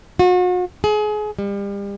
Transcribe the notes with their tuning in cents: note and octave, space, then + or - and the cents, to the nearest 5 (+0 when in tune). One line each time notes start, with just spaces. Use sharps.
F#4 -40
G#4 +30
G3 +35